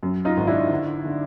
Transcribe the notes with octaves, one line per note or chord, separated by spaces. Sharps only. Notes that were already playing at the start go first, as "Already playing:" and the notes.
F#2
D#4 F4
G#1
D4 E4
D3
D3